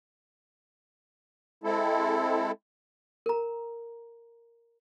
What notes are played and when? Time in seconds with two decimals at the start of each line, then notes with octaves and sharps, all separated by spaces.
1.64 G#3 C4 E4 A4
3.26 A#4 A#5